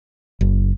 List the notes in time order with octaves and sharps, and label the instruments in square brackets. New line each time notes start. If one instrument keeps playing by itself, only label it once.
[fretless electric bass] F#1